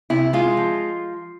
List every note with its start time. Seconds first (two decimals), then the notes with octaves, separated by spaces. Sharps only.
0.10 C3 E4
0.33 G#3 F4
0.57 F3